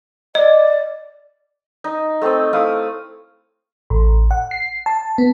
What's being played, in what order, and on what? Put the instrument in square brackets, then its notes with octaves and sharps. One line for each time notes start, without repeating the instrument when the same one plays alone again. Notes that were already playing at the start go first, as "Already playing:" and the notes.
[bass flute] D5 [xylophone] D#5
[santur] D#4
A3 C4 C#5 D#5
A3 E4 F5 D#6
[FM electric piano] A1
F#5
C7
A5
B3